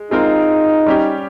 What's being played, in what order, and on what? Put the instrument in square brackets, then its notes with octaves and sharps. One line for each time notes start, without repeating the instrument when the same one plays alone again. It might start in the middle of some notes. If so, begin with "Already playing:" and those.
Already playing: [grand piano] G#3
[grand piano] G#3 C4 F4 A#4 [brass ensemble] D#4
[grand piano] G3 C#4 G4